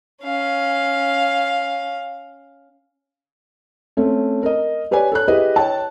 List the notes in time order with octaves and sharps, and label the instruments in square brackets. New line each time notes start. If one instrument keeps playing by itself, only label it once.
[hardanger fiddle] C#4 F5
[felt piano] A3 C4 C#4
A#4 D#5
G4 B4 C#5 D5 G#5
A4 C#5 F#6
E4 G4 G#4 B4 D#5
C#5 G5 A5